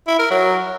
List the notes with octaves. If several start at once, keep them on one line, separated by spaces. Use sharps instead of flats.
E4
A#4
F#3